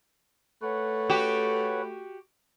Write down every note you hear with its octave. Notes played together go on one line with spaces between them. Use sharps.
A3 B4 C#5 F#5
F#4 G4